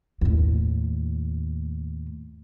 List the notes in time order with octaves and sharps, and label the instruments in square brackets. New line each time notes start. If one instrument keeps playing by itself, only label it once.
[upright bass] D#2 A2